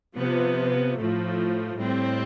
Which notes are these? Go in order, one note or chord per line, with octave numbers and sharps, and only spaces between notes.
C3 F3 B3
A2 F3 A3
A2 G3 C4